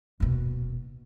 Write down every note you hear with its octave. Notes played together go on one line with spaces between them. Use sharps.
D#1 B2